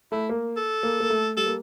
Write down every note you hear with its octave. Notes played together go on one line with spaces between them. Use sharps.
A3 E4
A#3
A4
A#3
A#3
A3
G3 A4
A#3